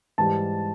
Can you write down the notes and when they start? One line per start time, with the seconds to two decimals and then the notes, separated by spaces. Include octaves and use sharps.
0.18 G#2 E3 G3 A5